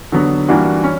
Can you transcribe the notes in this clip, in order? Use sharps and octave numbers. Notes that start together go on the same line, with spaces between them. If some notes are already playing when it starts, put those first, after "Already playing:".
D3 F#3 B3 F#4
E3 G3 A#3 D4 F#4
C#4